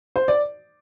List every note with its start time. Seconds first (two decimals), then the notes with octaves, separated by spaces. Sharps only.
0.16 C5
0.28 D5